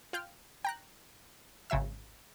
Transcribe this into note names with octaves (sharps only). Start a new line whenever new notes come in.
F4 G5 F6
G5 A#5 F#6
G#1 C#3 F#3 E5 E6